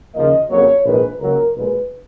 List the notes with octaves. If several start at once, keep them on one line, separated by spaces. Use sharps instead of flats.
D#2 C#3 F3 A#3 D#5
F2 C#3 F#3 A#3 C#5
A#1 G#2 D#3 G#3 B4
C#2 C#3 F#3 A#3 A#4
B1 A#2 G#3 B4